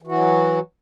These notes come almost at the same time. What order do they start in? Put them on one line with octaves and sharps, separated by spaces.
E3 F#4 F#3